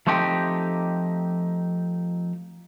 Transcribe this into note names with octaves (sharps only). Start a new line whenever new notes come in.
F3 A3 C4 D#4 G4